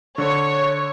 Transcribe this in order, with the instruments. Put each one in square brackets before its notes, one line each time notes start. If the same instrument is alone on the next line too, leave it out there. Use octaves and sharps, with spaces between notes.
[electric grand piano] D3 [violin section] C#5